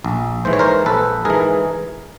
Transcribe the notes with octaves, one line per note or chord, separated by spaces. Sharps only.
A#1
G#2 E3 C5
C#5
A#4 C5
A#1 A4 B4
G#2 E3 G#4 A#4